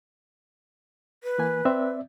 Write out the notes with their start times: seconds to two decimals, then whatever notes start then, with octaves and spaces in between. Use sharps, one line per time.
1.24 B4
1.38 E3 A#3 G#5
1.65 C4 D5 E5